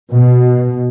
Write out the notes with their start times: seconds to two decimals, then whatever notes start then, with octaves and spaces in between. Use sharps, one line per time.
0.11 B2